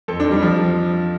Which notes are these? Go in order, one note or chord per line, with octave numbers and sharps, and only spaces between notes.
F2 A4
D4
F2
G3
F3